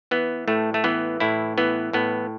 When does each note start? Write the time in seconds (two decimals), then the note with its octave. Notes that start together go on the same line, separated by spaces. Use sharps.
0.11 E3 B3
0.48 A2 A3
0.74 A3
0.84 E3 B3
1.20 A2 E4
1.58 E3 B3
1.93 A2 B3